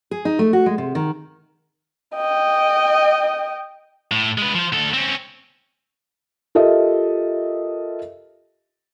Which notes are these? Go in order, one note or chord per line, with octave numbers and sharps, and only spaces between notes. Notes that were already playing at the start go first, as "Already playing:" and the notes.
G#4
D#4
A3
F#4
G#3
C3
D#3
D#5 G5
A2
G#3 B4
F3 C5
D2 A4
C4 C#4
F4 G4 A4 A#4 D#5 E5